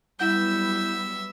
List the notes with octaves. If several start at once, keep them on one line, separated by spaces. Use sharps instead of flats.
F#3 G3 B3 E4 E5 F#5 G6